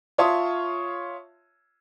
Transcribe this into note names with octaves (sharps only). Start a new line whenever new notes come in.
F4 C#5 E5 A5 C6 D#6